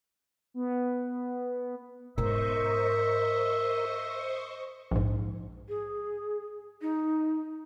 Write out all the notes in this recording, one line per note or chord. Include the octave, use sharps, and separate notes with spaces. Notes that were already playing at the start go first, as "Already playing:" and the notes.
B3
G#2 B3 A#4 C5 D#5 E5 C#6
A#1 G#2
G#4
D#4